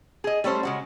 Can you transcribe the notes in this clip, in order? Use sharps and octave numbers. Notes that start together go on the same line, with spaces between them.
G#4 D#5
G3 A3 C#4 C5
C#3 G#3 F#4